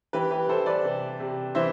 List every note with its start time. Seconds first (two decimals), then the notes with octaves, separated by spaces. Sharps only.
0.13 E3 G4 B4
0.31 G4 B4
0.48 E3 A4 C5
0.66 B4 D5
0.84 C3
1.20 C3
1.55 E3 C5 E5